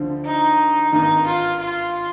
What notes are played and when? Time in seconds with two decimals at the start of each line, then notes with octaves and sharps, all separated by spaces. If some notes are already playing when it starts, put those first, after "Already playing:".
Already playing: D2 D3 F3 C4
0.26 D#4
0.92 G#1 G2 D#3 D#4
1.26 F4
1.60 F4